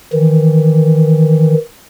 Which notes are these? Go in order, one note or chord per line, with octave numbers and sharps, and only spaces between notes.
D#3 E3